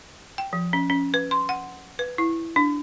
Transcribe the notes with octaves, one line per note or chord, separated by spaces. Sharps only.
G5
F3
C#4
C#4
B4
C6
F#5
B4
E4
D4